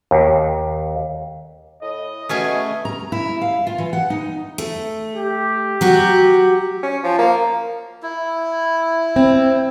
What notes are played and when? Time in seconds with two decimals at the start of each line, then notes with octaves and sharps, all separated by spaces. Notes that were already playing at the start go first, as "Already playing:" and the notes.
0.11 D#2
1.82 A2 D#5
2.29 B2 A3 C#4 G#4
2.85 A#5
3.12 E4
3.41 F5
3.67 F4
3.78 E3
3.93 F#5
4.10 D#4
4.58 A3
5.15 G4
5.81 F#3 F#4
6.83 C#4
7.04 F3
7.19 A#3
8.03 E4
9.16 C4